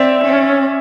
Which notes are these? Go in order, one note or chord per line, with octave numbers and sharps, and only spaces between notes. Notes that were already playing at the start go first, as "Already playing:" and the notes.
Already playing: C4 D5 E5
C#4